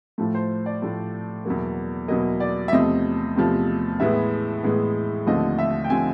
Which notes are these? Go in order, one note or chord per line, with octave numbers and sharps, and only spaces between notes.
A2 F3 A3
C5
D5
A2 F3 A3
E2 B2 F#3 A#3
E2 B2 F#3 A#3 D#5
D5
E5
E2 C3 F3 A3 C4 D#5
E2 C3 F3 A3 C4
A2 E3 G#3 B3 E5
A2 E3 G#3 B3
D#2 D3 F3 A3 C4 D#5
E5
G5
D3 F3 A3 C4 G#5